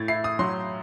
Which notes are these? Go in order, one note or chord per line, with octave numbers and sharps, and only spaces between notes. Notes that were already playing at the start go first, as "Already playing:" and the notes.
Already playing: A2 G#6 A6
E4 C7
D#6
F#3 C6